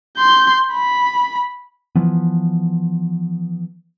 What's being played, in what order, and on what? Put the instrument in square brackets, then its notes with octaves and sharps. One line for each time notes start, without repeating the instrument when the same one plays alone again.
[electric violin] C6 G6
B5
[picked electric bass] E3 F3 B3